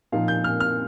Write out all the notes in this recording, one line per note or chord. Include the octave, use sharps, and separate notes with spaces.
A#2 F3 A#3 D#4 F5
G6
F6
F6